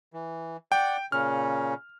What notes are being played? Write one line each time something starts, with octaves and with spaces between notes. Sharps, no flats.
E3
D5 F#5 G5
A#2 C#3 C#4 F6